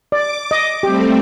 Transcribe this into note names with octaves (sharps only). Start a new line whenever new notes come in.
D5 D6
D#5
G3 A3 C4 G4